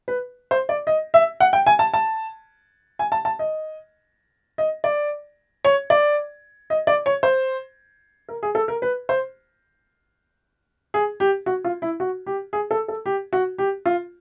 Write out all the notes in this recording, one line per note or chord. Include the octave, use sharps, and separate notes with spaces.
B4
C5
D5
D#5
E5
F#5
G5
G#5
A5
A5
G#5
A5
A5
D#5
D#5
D5
C#5
D5
D#5
D5
C#5
C5
A#4
G#4
A4
A#4
B4
C5
G#4
G4
F#4
F4
E4
F#4
G4
G#4
A4
A4
G4
F#4
G4
F4